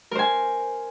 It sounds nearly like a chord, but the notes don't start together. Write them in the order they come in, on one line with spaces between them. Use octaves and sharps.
A#4 C5 G#5